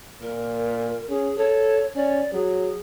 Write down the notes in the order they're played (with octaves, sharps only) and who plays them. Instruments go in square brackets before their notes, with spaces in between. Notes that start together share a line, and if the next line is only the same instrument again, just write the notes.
[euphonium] A#2 [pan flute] A#4
[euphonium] C#4 [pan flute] G#4
[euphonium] A4 [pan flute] C#5
[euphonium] C#4 [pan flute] D5
[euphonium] F#3 [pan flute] G#4